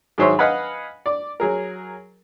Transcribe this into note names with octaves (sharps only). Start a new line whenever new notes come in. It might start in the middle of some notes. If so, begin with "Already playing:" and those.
G#2 D#3 F#3 C5 C#5 E5
B4 D#5 F5 F#5 G#5 B5
D5
F#3 G#4 A#4